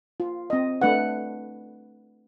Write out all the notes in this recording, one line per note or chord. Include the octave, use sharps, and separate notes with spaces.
F4
C4 D#5
A3 D4 B4 F#5